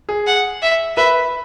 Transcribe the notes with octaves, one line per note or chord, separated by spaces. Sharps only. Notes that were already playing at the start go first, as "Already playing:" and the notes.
G#4
F#5
E5
B4 E5